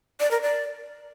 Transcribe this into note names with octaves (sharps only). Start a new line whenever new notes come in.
D5
A#4
D5